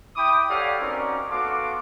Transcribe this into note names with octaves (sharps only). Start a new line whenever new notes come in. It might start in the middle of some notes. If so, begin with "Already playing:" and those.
E4 G5 B5 D6 D#6
G4 A4 C#5 D5 F5 F#5
C4 C#4 D#4 F#4 A#4 D5
B3 F#4 A4 F5 C6 D6